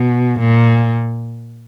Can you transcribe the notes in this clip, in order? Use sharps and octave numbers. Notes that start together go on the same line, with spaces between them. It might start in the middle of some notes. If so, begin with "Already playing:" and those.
Already playing: B2
A#2